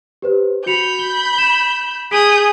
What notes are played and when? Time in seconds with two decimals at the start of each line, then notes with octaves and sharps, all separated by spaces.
0.22 G4 B4 C5
0.66 F#4 B5 G6 C#7 F7
0.99 G7
1.38 E7
2.11 G#4 D#6 G6 B6 D7 G7